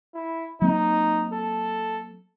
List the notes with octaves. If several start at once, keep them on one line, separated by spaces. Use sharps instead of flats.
E4
F#3 A#3 C4 D#4
A4